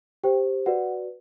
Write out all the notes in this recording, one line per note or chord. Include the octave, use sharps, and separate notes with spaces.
G4 C5 G5
F#4 B4 D5 F#5